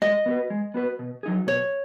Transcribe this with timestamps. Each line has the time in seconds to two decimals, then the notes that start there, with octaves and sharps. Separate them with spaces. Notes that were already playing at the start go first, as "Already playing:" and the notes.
0.02 G#3 D#5
0.26 B3 F#4 B4
0.50 G#3
0.74 B3 F#4 B4
0.99 B2
1.23 F#3 D#4 G#4
1.47 B2 C#5